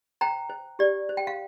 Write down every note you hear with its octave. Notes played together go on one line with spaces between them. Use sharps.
C5 G5 A#5
C5
G4 D5
C5
G5
F5